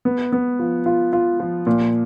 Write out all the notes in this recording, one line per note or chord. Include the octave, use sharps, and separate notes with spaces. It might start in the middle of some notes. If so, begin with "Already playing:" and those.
B3
B3
F3
F4
F4
F3
A#2